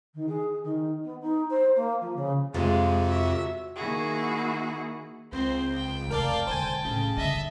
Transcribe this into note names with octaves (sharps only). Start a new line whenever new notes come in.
D#3
G#4
D#3
B3
D#4
C5
A#3
F3
C#3
F2 C3 G#3 F4 C5
F#4 E5
D#3 A#3 E4 F#4 G#4
C#2 C4 C5
G5
F1 C3 A#4 D5 F5 A5
E1 D3 C5 G#5
A2 C#3
G2 D3 D#5 E5